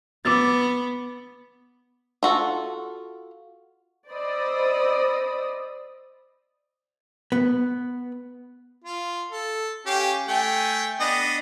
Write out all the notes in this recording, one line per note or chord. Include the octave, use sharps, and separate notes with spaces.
B3 D6 E6 A6
F4 F#4 A4
C5 D5 D#5 B5 D#6 E6
B3
F4
A4
C#4 G4 F5
A3 G5 G#5
B3 D4 D#5